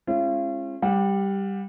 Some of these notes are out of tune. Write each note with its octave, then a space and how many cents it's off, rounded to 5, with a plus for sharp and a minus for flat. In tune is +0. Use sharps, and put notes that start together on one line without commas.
G#3 +0 C#4 -35 F4 -40
G3 +5 G4 +0 F#5 -30